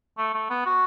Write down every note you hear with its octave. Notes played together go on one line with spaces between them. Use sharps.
A3
A3
B3
F#4